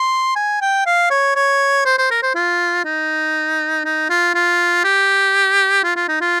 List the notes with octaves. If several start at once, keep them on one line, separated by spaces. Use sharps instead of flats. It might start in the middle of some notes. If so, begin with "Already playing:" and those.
Already playing: C6
G#5
G5
F5
C#5
C#5
C5
C5
A#4
C5
F4
D#4
D#4
F4
F4
G4
F4
F4
D#4
F4